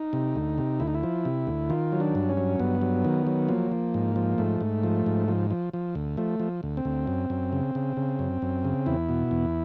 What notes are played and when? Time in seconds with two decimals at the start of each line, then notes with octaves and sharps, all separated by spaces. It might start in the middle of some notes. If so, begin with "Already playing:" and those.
Already playing: D#4
0.13 C3
0.36 D2
0.58 C3
0.80 D2 E4
0.87 D#4
0.94 E4
1.03 F3
1.25 C3
1.47 D2
1.70 D#3 F4
1.92 F#3
2.00 D4
2.15 G2
2.29 C#4
2.37 F#3
2.59 G2 B3
2.82 F#3
3.05 D#3
3.27 F#3
3.48 F3 A#3
3.72 F3
3.94 G#2
4.16 F3
4.38 G#2 A3
4.61 G#2
4.83 F3
5.06 G#2
5.28 F3
5.51 F3
5.74 F3
5.95 D2
6.17 F3 A3
6.40 F3
6.63 D2
6.77 C4
6.85 D2
7.07 F#2
7.30 F#2
7.53 C#3
7.75 C#3
7.97 C#3
8.19 F#2
8.42 F#2
8.65 C#3
8.86 E2 E4
9.09 B2
9.31 E2